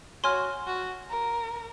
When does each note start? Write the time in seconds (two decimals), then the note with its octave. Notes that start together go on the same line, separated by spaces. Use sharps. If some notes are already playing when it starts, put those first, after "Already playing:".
0.24 F#4 C#5 G#5 C6 F6
0.67 F#4
1.10 A#4